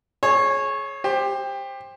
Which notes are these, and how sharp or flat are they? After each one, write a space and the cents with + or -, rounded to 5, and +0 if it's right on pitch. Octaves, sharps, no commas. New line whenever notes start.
G#4 +35 C#5 -15
G4 +20 C5 +15